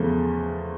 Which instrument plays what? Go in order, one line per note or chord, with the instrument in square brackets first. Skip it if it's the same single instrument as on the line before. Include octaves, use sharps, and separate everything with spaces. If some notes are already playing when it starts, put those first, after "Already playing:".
Already playing: [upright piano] E2 C#3 F3 A3